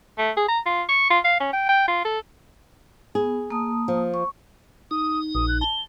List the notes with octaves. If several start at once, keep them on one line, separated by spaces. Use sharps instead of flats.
A3
G#4
A#5
F4
C#6
F4
F5
C#4
G5
G5
F4
A4
B3 G#4
A#3 A5 D#6
F3
C#6
D#4 D#6
A#1 D#6
F#6
A5 G7